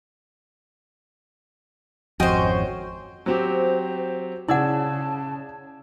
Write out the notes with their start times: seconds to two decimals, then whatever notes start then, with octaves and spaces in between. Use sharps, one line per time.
2.20 G#1 F2 C#4 F#4 C5 D#5 G5 G#5
3.26 F#3 C4 G4 C5
4.48 C#3 E4 D5 F#5 A5 E6 G#6